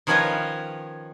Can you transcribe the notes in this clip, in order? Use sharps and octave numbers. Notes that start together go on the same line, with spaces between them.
D#3 F3 C#4 B4 C#5 D#5